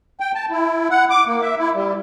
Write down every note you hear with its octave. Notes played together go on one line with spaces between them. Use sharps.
G5
A5
E4
F#5
D6
A#3
E5
E4
G3